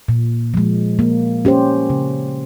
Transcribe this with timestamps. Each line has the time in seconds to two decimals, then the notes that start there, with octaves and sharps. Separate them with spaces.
0.08 A#2
0.54 F3 G#3
0.99 A#3
1.45 C#4 G4 C5
1.90 C#3